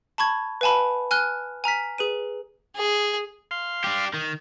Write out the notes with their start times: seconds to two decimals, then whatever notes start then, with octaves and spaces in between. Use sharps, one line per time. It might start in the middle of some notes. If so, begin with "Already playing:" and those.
0.18 A5 B5 C#6 G#6
0.61 B4 F5 G#5 A5 B5
1.11 G#5 F6 F#6 G7
1.64 G#5 A#5 F6 B6
1.98 G#4 B4 D#7
2.76 G#4
3.51 F5 C6
3.84 D4 G4
4.13 D#3